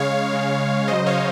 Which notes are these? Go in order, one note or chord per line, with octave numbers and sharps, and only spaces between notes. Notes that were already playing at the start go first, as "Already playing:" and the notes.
Already playing: C#3 G#3 C#5 F5
C#3 G#3
C#3 F#3 C5 D#5
C#5 F5